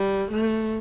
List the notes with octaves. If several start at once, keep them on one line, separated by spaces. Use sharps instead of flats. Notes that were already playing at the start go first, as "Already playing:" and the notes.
Already playing: G3
A3